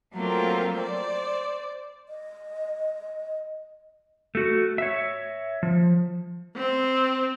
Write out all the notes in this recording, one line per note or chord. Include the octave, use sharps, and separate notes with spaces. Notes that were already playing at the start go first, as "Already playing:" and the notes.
F#3 A3 A#3 C4 F4 A#4
C5 D5
D#5
A3 F#4
C#5 E5
F3
C4